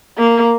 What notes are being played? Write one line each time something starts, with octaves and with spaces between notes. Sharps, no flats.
A#3